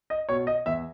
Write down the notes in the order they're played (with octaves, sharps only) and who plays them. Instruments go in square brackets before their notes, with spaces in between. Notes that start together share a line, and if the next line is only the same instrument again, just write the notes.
[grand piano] D#5
B2 C#5
D#5
E2 E5